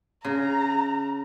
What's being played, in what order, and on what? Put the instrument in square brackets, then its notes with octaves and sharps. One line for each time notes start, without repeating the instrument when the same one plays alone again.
[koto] C#3 [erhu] A#5